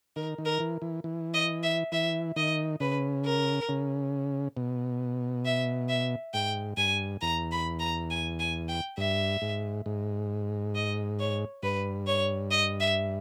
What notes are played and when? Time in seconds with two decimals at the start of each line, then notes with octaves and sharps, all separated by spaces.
0.16 D#3 A#4
0.38 D#3
0.45 A#4
0.60 E3
0.82 E3
1.04 E3
1.34 D#5
1.63 E5
1.92 E3 E5
2.36 D#3 D#5
2.80 C#3 B4
3.25 A#4
3.69 C#3
4.57 B2
5.46 E5
5.89 E5
6.34 G#2 G5
6.77 G2 G#5
7.21 E2 A#5
7.52 B5
7.80 A#5
8.10 G#5
8.39 G#5
8.69 G5
8.98 G2 E5
9.42 G#2
9.86 G#2
10.75 D#5
11.19 C#5
11.63 G2 B4
12.07 C#5
12.51 D#5
12.80 E5